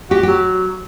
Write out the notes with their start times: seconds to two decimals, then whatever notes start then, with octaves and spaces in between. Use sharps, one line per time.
0.11 F#4 G4
0.23 F#3 G4